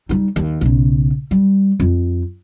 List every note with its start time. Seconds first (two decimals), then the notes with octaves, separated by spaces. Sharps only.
0.09 G3 D#4
0.36 D#2
0.61 B1 C#3
1.31 G3
1.80 F2